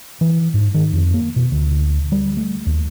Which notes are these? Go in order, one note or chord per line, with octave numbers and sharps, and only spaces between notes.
E3
G#2
D#3
F2
A#3
B2
D2
G3
A3
D#2